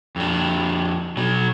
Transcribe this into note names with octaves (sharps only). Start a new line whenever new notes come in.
F2 D4
B2 F#3